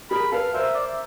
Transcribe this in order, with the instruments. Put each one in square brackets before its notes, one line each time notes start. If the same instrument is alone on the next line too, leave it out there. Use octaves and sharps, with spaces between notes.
[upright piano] G#4 A#4 [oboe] B5
[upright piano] A4 B4 [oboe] F5
[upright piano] A#4 C5 [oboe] E5
[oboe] D5
E5